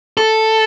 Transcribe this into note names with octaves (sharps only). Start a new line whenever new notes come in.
A4